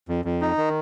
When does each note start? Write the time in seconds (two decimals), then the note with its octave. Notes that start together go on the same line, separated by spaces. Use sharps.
0.09 F2
0.25 F2
0.41 D#4
0.58 D#3